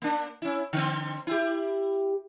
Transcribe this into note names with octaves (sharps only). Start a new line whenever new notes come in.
A#3 D4
C#4 E4
D3 C4
E4 G4